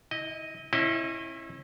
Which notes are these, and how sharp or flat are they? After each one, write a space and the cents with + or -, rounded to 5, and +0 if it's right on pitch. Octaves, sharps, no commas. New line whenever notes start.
E4 -35 D#5 +0
C#4 -35 E4 +0 D#5 +0